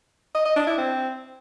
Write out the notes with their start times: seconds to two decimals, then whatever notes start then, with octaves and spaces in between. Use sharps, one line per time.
0.35 D#5
0.45 D#5
0.56 D4
0.67 E4
0.77 C4